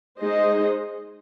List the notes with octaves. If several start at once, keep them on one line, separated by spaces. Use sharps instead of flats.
G#3 D#4 G#4 C5 D#5